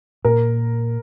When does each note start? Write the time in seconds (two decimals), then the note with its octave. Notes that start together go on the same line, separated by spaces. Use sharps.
0.25 A#2 A#4